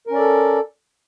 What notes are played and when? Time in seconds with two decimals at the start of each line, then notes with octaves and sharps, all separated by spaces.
0.07 A#4
0.11 C#4
0.15 D5
0.19 A4